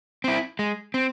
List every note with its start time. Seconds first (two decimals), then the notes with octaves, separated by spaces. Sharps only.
0.24 C4 E4
0.59 G#3
0.94 C4